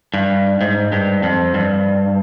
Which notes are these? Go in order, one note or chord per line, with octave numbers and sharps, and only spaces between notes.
G2
G#2
G2
F2
G2